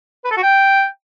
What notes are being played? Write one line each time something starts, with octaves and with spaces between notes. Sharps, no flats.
B4
A4
F#4
G5